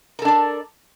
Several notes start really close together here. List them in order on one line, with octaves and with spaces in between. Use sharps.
A#4 A4 D4 D5